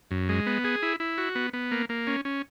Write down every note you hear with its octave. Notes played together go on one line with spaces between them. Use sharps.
F#2
G#3
B3
G#4
E4
E4
F#4
B3
B3
A#3
A#3
C#4
C#4